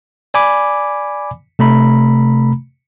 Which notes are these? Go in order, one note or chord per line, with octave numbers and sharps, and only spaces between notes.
D5 G#5 B5 D6
C3 A3 A#5 B5